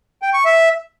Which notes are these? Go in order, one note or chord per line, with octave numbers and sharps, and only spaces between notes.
G5
C#6
E5